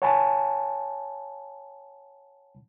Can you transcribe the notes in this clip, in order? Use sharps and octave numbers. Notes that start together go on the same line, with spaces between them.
C#5 F#5 G#5 A5 B5